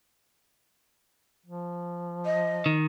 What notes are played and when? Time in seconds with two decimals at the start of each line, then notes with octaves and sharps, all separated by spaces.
1.46 F3
2.26 D#5
2.66 D#3